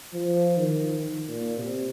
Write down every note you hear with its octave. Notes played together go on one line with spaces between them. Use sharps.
F3
D#3
A#2
C3